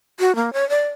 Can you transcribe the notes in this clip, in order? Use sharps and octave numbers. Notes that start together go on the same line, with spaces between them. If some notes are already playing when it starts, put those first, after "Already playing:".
F#4
A#3
C#5
D5